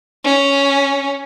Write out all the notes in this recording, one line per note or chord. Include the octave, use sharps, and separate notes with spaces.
C#4